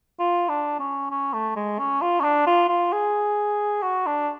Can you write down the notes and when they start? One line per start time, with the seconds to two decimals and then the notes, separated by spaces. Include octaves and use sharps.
0.19 F4
0.49 D4
0.79 C#4
1.10 C#4
1.33 A3
1.56 G#3
1.79 C#4
2.01 F4
2.20 C#4
2.23 D4
2.46 F4
2.69 F4
2.92 G#4
3.82 F#4
4.06 D4